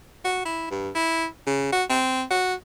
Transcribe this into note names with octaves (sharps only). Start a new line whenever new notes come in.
F#4
E4
G2
E4
C#3
F#4
C4
F#4